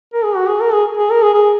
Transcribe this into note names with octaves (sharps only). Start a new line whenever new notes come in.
A#4
G#4
F#4
G#4
A#4
G#4
G#4
A#4
G#4
G#4